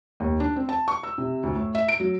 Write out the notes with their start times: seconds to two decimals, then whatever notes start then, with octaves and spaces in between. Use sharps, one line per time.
0.20 D#2
0.40 D4
0.56 C4
0.69 A5
0.88 C#6
1.03 E6
1.18 C3
1.43 D2
1.55 A2
1.75 E5
1.88 D7
2.00 F#3